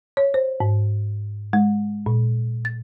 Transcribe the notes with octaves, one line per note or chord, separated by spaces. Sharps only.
C#5
C5
G#2
G#3
A#2
A6